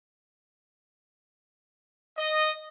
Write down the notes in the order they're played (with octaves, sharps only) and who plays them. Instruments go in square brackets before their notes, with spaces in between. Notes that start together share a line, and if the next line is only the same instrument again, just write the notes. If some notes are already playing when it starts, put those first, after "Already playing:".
[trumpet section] D#5